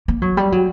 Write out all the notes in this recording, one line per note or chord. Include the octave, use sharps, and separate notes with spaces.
A#3
F#3
G3
F#3